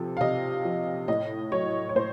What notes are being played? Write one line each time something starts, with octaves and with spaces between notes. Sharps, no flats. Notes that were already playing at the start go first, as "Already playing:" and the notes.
Already playing: C3 F3 A4
F5
C3 D#5
F3
A2 D#5
F#3 C#5
C#5
A2 C5